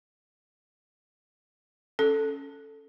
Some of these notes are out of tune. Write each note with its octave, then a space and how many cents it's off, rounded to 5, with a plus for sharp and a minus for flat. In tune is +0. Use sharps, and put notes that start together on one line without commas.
C#4 +0 A4 +0